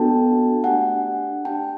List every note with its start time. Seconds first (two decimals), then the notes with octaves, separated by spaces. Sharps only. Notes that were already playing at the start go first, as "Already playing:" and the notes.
Already playing: B3 D4 F#4 A4 G5 A5
0.64 A3 D4 G4 F#5 G#5
1.45 D4 G4 G5 A5